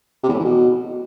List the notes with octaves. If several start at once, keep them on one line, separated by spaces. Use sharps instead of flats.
C3
E2
A2
E3
B2